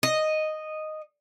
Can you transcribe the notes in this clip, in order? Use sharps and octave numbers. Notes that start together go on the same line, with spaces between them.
D#5